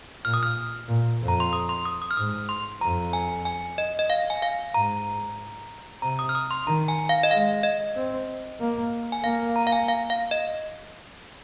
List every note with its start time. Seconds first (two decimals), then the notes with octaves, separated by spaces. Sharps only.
0.25 A#2 F6
0.34 D#6
0.43 F6
0.88 A#2
1.21 F2
1.28 A#5
1.40 C6
1.53 D#6
1.69 C6
1.85 D#6
2.02 D#6
2.11 F6
2.17 G#2 D#6
2.49 C6
2.81 F2 A#5
3.13 G#5
3.45 G#5
3.78 D#5
3.99 D#5
4.10 F5
4.30 G#5
4.42 F5
4.74 G#2 A#5
6.02 C3 A#5
6.19 D#6
6.29 F6
6.35 D#6
6.51 C6
6.67 D#3 A#5
6.88 G#5
7.09 F5
7.23 D#5
7.31 G#3 F5
7.63 D#5
7.96 C4
8.60 A#3
9.12 G#5
9.24 A#3 F5
9.56 A#5
9.67 F5
9.72 G#5
9.88 F5
10.10 F5
10.31 D#5